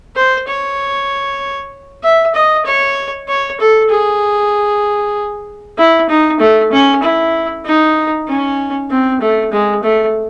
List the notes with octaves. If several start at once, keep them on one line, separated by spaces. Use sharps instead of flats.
C5
C#5
E5
D#5
C#5
C#5
A4
G#4
E4
D#4
A3
C#4
E4
D#4
C#4
C4
A3
G#3
A3